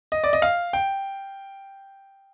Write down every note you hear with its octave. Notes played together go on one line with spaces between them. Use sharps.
D#5
D5
D#5
F5
G5